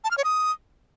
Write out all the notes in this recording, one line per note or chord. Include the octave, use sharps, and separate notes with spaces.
A5
F6
C#5
D#6